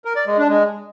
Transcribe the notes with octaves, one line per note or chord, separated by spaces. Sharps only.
A#4
D5
G#3
D4
G#3